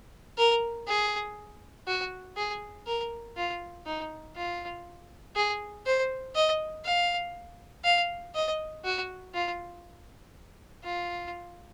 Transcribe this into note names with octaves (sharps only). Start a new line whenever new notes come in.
A#4
G#4
F#4
G#4
A#4
F4
D#4
F4
G#4
C5
D#5
F5
F5
D#5
F#4
F4
F4